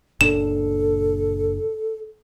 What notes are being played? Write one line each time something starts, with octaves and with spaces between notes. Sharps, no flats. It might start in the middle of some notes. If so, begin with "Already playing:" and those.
F#1 A#2 D4 A4 E7